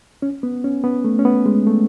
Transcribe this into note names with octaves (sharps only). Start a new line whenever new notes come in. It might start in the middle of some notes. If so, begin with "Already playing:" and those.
C#4
B3
C#4
B3
A3
C#4
B3
G#3
A3